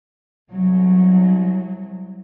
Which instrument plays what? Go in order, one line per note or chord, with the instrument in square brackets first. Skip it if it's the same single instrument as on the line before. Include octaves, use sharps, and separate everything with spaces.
[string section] C2 F#3